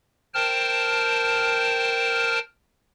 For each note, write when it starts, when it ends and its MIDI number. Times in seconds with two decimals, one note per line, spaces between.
0.34 2.39 70
0.34 2.39 72
0.34 2.39 79
0.34 2.39 81
0.34 2.39 89